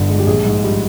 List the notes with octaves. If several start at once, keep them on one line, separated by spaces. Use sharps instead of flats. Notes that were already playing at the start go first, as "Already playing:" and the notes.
Already playing: G1 G2 D3
G#3
G4
A#1 G#4
G#2
G3